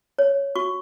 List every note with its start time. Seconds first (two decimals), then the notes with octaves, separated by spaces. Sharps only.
0.19 C#5
0.55 F#4 C#6